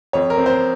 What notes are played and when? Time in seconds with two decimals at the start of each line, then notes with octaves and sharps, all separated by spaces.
0.13 F2 C#5
0.30 A#4
0.37 C4
0.46 C5